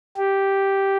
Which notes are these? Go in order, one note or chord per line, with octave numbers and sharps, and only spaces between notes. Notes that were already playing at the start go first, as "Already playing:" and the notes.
G4